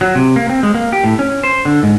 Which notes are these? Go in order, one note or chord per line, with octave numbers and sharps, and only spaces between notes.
F#3
C3
A#3
C4
G#3
A#3
G4
A2
C#4
C5
D3
G#2